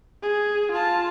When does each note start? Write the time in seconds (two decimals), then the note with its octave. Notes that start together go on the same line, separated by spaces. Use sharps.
0.23 G#4
0.72 F4 A5